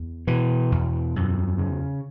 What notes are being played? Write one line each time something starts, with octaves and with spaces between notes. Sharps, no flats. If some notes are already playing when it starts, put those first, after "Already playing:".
Already playing: E2
B2 E3
E2
F#2
C#3